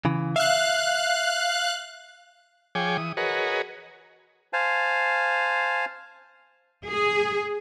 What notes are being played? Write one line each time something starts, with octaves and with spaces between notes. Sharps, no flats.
C#3 E3
E5 F5 F#6
F3 G#4 C#5 G5 G#5 D6
E3 D#6
F#4 G#4 A#4 B4 C#5 D#5
C5 F5 G#5 A5
G#4